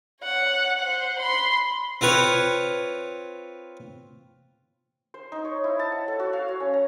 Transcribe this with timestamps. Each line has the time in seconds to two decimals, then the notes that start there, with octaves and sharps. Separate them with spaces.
0.21 C#5 F#5
0.78 C5 F#5
1.19 B5 C6
2.01 C4 F4 B4 C#5
5.14 C5
5.32 D#4
5.45 C#5
5.64 E4
5.79 A5
5.92 F#5
6.08 A4
6.20 F#4
6.33 F5
6.48 C#5
6.60 C#4
6.73 A#5